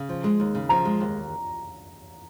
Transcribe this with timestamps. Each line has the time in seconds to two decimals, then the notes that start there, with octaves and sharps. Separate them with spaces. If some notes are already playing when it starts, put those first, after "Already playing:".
Already playing: C#3
0.09 F3
0.24 G#3
0.40 D#2
0.55 C#3
0.69 F3 A#5
0.85 G#3
1.00 D#2